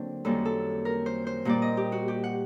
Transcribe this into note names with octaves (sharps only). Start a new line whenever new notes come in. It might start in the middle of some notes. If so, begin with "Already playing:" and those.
Already playing: D3 F#3 A#3 C4 D4
F#2 D#3 G3 A#3 A4
A4
A#4
C5
C5
A#2 G3 A#3 D5
D#5
G4
F#4
G4
F#5